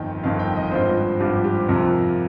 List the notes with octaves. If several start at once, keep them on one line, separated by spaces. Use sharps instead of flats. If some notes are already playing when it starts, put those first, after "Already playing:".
Already playing: G1 F2 D#3 G5
G1 F2 D#3 F5
G5
D#5
G#1 G2 F3 C5
G#1 G2 F3 G4
G4
F2 C3 F3 A#4